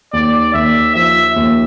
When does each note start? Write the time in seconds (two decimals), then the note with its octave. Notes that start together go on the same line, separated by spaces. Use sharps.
0.13 D#2 D5
0.54 D#2 E5
0.95 F3 E5
1.36 D#2